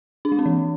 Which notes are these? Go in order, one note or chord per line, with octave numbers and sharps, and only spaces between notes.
D4
G#3
C4
E3